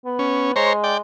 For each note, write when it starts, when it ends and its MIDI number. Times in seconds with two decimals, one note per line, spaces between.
0.05 0.55 59
0.19 0.52 61
0.56 1.01 56
0.56 0.73 72
0.56 0.73 73
0.56 0.73 82
0.84 0.98 74
0.84 0.98 79